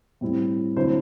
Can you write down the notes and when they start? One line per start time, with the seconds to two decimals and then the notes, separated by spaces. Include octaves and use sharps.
0.21 A2 G3 C4 E4
0.76 D3 F#3 C4 E4 C5